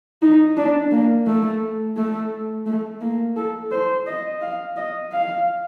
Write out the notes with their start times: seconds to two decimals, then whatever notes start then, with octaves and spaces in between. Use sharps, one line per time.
0.22 D#4
0.57 D4
0.91 A#3
1.27 A3
1.97 A3
2.66 A3
3.01 A#3
3.36 A4
3.72 C5
4.06 D#5
4.42 F5
4.76 D#5
5.12 F5